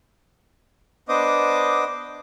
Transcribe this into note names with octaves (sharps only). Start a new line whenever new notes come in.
B3 D4 C5 D#5 D6 D#6